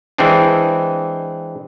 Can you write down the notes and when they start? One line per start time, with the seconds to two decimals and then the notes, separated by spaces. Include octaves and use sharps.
0.18 E3 G#3 C4 D4